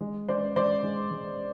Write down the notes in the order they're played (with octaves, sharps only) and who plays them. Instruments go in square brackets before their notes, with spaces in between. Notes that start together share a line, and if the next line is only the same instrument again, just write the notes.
[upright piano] G#3
G#3 C5 D5
G#3 C5 D5
G#3
G#3